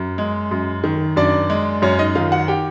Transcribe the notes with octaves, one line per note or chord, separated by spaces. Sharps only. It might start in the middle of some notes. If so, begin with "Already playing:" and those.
Already playing: F#2
G#3
F#2
D#3
F#2 D4 D5
G#3
F#2 C#4 C#5
D#4 D#5
D#3 F4 F5
F#4 F#5
G4 G5